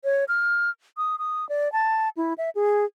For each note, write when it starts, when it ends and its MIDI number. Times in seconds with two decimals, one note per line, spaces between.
0.04 0.24 73
0.28 0.70 89
0.97 1.16 87
1.19 1.47 87
1.49 1.71 74
1.72 2.09 81
2.17 2.33 64
2.38 2.50 76
2.55 2.85 68